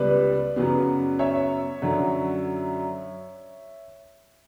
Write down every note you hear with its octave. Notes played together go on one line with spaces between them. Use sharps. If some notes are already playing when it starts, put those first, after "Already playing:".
Already playing: C#2 C#3 G3 B3 B4 D5
F#2 C#3 F#3 B3
C#5 E5
F#2 D3 F#3